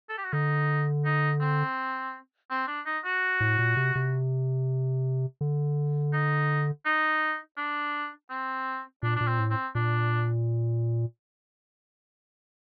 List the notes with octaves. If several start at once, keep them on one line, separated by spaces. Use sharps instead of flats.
A4
G4
F#4
D3 D#4
D#4
C4
C4
D4
D#4
F#4
A2
A#2
C3
C3
D3
D#4
D#4
D4
C4
A#2 D4
A#2 D4
C4
A2
C4
A#2 D4